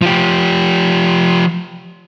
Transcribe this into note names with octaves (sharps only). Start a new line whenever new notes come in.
F3 G4